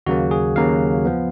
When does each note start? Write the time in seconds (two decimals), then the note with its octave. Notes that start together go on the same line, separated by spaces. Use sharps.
0.06 D#2 C#3 F#3 A#3 F#4
0.31 G#4
0.56 D#2 C#3 F#3 A#3 F5
1.05 F3 B3